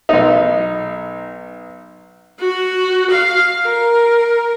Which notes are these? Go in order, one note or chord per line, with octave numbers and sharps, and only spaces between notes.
B1 D#4
F#4
F5
A#4